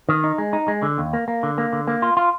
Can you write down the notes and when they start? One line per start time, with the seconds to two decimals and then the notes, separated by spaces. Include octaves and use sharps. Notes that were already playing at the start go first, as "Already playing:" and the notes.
0.09 D#3
0.24 D#4
0.38 G#3
0.53 D#4
0.68 G#3
0.83 D3
0.98 D#2
1.13 A#3
1.28 A#3
1.43 D3
1.58 A#3
1.73 D3
1.87 A#3
2.02 F4
2.17 F4